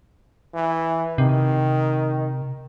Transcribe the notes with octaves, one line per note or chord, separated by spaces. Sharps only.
E3
C3 D#3